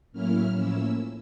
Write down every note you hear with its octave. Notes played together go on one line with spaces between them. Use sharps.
A2 F#3 A#3 C#4 E4 F6
A2 F3 A#3 C#4 E4 E6